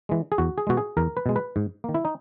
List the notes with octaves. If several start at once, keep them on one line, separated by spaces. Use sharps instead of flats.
E3 G#3
G#4
E2 F#4
G#4
B2 G#3 F#4
G#4
E2 A#4
B4
B2 G#3
B4
G#2
D#3 A#3
E4
D#4